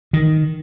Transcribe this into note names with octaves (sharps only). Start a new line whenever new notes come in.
D#3